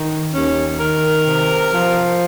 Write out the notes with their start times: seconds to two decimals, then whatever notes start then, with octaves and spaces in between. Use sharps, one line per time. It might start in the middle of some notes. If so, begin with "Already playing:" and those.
Already playing: D#3
0.34 D#2 C#4
0.79 D#3 A#4
1.26 C3
1.72 F3